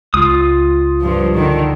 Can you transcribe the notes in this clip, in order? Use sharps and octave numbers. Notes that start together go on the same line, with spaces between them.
C#2 F4 D#6
G2 F3
D3 D#3